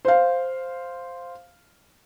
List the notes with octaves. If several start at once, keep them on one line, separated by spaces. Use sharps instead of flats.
C5 F5